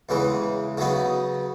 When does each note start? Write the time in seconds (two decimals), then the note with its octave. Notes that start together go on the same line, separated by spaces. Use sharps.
0.09 E2 C#3 E3 G#3
0.77 C#3 F#3 B3 D#4